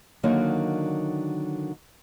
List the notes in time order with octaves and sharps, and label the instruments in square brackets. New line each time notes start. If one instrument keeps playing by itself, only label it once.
[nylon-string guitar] D3 D#3 F#3 A#3 D#4 C#5